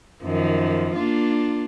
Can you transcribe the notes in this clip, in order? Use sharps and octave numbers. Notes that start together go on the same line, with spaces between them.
F#2 D#3 F3
A#3 D4 F4